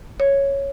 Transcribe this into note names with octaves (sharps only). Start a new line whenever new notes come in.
C#5